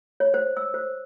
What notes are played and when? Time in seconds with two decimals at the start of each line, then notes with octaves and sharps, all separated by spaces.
0.20 C#5
0.34 C5
0.57 E6
0.74 C5